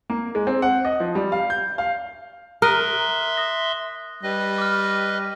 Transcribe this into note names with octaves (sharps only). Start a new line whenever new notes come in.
A#3
G#3
C4
F#5
D#5
F3
G3
F5
G6
F5
A#4 E5 C6 D#6 F#6 D#7
D#6 A#6
G3 B4 D#5
D6 F6